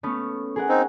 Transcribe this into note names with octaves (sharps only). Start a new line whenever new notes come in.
A3 B3 C#4
G#4 A#4 F#5
C4 D#4